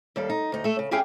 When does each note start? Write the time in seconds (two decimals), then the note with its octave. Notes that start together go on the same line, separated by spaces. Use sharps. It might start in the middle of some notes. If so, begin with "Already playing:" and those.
0.16 D#2 G3 A4 F5
0.30 D#4
0.52 D2 D#4
0.64 A3 A4
0.79 C#3
0.91 C#4 E4 G4 G#4 F5 G5